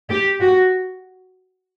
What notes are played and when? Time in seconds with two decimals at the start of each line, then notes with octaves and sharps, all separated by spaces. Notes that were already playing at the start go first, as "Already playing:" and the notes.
0.10 G4
0.41 F#4